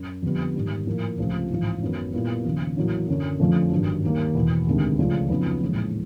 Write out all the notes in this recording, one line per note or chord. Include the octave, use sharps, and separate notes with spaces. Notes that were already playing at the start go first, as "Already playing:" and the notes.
Already playing: F#2
F2 D3 G3 B3
G#2 D#3 G3
A2 F3 A#3
C#2 C3 F3 A3 C4
A1 G#2 F3
G#1 F#2 D#3 F#3 B3
A#2 G3 B3 E4
D#2 C#3 F3
A1 A2 F#3 A#3
F#2 D3 F#3
F2 D3 F3 A3 C#4
G#1 G2 D#3 F#3
D#2 D#3 G3 A#3
E1 E2 B2
D2 C3 D#3 G#3
C#2 C#3 F3 A3 D4
F2 C#3 F#3 B3 D#4
A#1 A2 E3 G#3